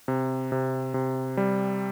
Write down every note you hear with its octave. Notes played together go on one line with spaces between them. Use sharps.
C3
C3
C3
G3